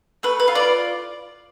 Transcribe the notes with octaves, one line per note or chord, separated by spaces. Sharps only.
A3 B4
B4
F4
D5